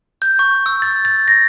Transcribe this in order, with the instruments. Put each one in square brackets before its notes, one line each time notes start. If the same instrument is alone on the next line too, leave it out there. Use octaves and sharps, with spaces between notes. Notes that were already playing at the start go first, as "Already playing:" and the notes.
[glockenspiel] G6
C#6
E6
A6
A6
A#6